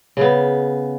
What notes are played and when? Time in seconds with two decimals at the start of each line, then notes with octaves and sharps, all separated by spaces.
0.17 C#3 B3